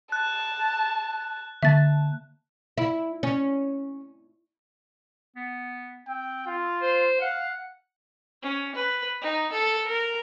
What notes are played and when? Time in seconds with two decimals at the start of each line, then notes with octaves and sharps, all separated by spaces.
0.12 A5 F#6
1.63 D3 A#3 E5 A5 A6
2.78 E4
3.23 C#4
5.36 B3
6.08 C4 G5
6.47 F4
6.82 C5
7.21 F5 F#5
8.43 C#4
8.75 B4
9.21 D#4
9.52 A4
9.87 A#4